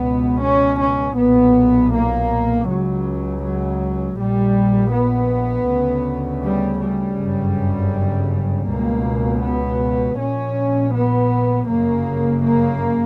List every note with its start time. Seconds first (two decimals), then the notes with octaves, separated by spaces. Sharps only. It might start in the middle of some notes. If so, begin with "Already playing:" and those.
Already playing: C#2 B2 B3
0.42 C#4
0.80 C#4
1.17 B1 A#2 B3
1.92 A#3
2.68 C#2 C#3 F#3
3.42 F#3
4.18 A#1 A#2 G3
4.92 B3
5.68 D2 C#3
6.43 G3
6.81 G3
7.19 G1 F#2 C#3
8.69 C#2 B2 A#3
9.44 B3
10.19 A#1 A#2 C#4
10.95 B3
11.69 G1 F#2 C#3 A#3
12.44 A#3